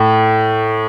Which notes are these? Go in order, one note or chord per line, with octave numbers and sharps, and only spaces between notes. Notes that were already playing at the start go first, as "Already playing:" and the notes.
Already playing: A2